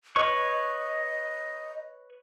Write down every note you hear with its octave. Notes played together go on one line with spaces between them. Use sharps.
B4 C#5 D#5 C#6